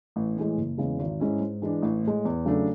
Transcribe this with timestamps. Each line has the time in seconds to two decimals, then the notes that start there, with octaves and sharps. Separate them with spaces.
0.16 A1
0.37 A2 E3 G#3
0.57 F#1
0.78 E2 C#3 E3 G#3
0.99 G#1
1.20 G#2 G#3 C#4 E4
1.41 G#2
1.62 E3 G#3 D4
1.82 A1
2.04 A2 G#3
2.25 E2
2.45 C#3 F#3 A3 D4